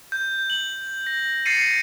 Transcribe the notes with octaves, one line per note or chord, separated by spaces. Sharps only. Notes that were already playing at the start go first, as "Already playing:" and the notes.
G6
F#7
A#6
A6 A#6 C7 C#7 D#7